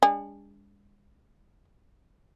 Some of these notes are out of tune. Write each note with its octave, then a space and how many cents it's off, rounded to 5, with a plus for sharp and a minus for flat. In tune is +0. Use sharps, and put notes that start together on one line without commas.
G#3 -40 D4 -25 G#4 -40